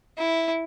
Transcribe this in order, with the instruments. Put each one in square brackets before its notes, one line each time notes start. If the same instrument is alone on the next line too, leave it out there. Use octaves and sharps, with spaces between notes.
[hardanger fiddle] E4